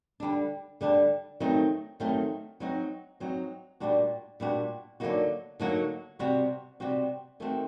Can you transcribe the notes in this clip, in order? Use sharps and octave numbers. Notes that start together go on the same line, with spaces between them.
D3 G3 D4
D3 G3 D4
D#3 F#3 A3 C4 D#4
D#3 F#3 A3 C4 D#4
F#3 C4 D#4 F#4
F#3 C4 D#4 F#4
A#2 G3 D4 F#4
A#2 G3 D4 F#4
D3 F#3 A#3 D#4 F#4
D3 F#3 A#3 D#4 F#4
C3 G3 C4 F#4
C3 G3 C4 F#4
D#3 A3 C4 F#4